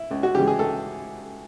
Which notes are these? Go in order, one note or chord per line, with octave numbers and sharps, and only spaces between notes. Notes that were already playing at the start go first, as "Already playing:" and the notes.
Already playing: E4
C#2
F#4
C#3 E3 G#3 G4
G#4
C#2 A4